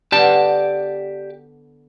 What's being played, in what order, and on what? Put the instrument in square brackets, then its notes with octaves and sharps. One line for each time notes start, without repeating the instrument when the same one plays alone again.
[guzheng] D3 B3 D4 [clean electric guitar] G4 D5 A5